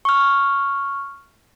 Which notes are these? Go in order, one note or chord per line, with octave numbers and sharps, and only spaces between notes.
C#6 F6